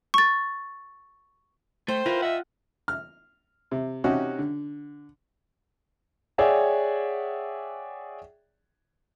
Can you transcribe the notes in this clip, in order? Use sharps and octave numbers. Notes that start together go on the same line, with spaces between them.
C#6 A6
A3 C5 G5
E4 F4 A#4 B4
D#5 E5 F#5
F6
C3
C3 C#4 D#4 F#4 G4
D3
G#4 C#5 D5 E5 F#5 G5